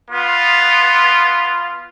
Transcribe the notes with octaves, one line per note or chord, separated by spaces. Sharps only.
B3 F4